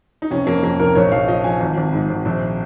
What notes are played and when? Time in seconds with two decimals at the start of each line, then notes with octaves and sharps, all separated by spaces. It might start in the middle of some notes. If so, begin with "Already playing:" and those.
0.22 D#4
0.31 F1 C#4
0.47 F2 A#3
0.63 F2 A#3
0.80 F1 A#4
0.95 A#1 C#5
1.12 A#1 F5
1.28 F3 D#5
1.44 F3 G#5
1.60 G#1
1.77 G#1
1.93 G#2
2.09 G#1
2.25 A#1